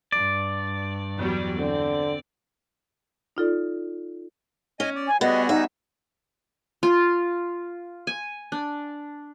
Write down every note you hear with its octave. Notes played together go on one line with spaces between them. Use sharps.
G2 D5
E2 F#3 G3
D3 C4
D#4 F4 A4 D5
C#4 D#5 G#5
D5
G#5
G3 B3 F#4 G#4 D#5
D#4 E5
F4
G#5
D4